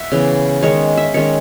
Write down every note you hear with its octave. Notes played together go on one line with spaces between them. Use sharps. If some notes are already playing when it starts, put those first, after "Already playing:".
Already playing: E5 F#5
C#3 E3 B3
D#3 G#3 C#4 C#5
E5
D#3 G#3 C#4 C#5